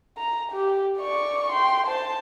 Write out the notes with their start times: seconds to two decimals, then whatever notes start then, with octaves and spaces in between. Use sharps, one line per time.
0.17 A#5
0.52 G4
0.98 D5 C#6
1.52 G5 C6
1.87 C5 A5